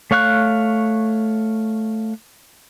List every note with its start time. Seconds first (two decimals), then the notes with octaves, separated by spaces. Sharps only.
0.11 A3 C#5 F5 C#6 F#6